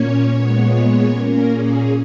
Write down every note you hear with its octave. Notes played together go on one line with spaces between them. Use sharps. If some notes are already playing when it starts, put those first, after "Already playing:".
Already playing: A#2 A#3 C#4 C#5
A#2 G#3 B3
A#2 A#3 C#4 A#4
G#4